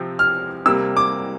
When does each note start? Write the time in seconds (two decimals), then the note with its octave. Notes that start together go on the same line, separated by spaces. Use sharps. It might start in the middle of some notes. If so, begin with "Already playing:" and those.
Already playing: C3 F3 C4
0.19 F6
0.66 C3 G3 A#3 E6
0.97 D6